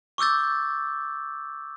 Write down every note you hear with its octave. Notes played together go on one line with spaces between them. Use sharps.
C#6 D6 E6 G6 A6